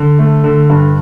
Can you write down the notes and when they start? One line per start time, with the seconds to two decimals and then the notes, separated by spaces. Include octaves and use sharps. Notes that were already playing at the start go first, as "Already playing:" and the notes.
Already playing: D3
0.19 A3
0.44 D3
0.70 G2